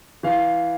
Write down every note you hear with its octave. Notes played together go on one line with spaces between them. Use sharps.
E3 F5